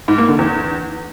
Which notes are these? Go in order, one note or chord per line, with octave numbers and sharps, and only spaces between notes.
G#2
A#3
D3
E2